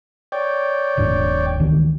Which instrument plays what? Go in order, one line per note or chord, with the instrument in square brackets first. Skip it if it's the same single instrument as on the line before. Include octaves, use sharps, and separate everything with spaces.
[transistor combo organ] C#5 D5 G5
[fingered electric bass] D#1 G#2 D4
C#2 D#3 E3